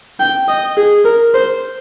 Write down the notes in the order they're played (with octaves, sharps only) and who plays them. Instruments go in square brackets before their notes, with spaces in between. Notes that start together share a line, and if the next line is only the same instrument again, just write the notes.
[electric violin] G5
D#5
G#4
A#4
C5